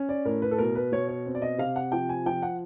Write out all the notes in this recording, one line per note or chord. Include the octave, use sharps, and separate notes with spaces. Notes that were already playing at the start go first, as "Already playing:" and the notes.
Already playing: C#4
D5
A2 A#4
B4
A4
B2 A#4
B4
B2 C#5
C#5
C4
D5
D#5
C3 F5
F#5
F3 G5
G#5
F3 G5
F#5